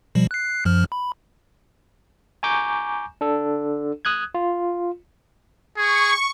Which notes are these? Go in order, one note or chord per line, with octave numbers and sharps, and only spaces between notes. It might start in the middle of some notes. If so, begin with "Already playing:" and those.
B2 F3 G3
F#6 C7
F#2 F3 F6
B5
G#5 A#5 C#6 D6 G6
D4 A4
D#6 F#6 G#6
F4
G#4 C#6